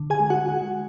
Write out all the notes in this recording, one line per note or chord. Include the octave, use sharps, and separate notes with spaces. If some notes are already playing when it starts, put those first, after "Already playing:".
Already playing: D3
G#4 G#5
G#3
F#4 F#5
G#3